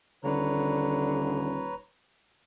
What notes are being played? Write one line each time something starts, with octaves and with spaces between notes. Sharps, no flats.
D#1 D3 B4 C#5 A#5